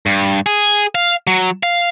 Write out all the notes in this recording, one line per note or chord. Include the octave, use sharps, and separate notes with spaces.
G2
G#4
F5
F#3
F5